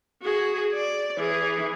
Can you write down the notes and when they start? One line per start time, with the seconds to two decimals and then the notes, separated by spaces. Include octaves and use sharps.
0.22 F#4 G#4
0.73 D5
1.18 E3 G#4